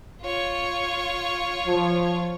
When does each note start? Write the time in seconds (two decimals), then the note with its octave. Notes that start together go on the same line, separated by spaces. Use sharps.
0.22 F4 C#5
1.67 F3